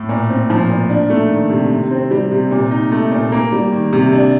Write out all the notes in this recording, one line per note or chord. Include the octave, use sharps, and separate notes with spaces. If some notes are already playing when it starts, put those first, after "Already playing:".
Already playing: A2
A#2
C4
F3
A#2
D4
A3
D#3
C3
C3
C4
G3
C3
A#2
D#4
A3
A#2
A#3
G3
D#3
C3
D4